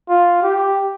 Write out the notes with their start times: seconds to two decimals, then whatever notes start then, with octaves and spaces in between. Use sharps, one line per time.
0.09 F4
0.43 G4